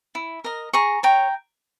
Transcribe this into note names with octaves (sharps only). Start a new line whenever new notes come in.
E4
A#4 D#5
G#4 A#5 C#6
C#5 G5 A#5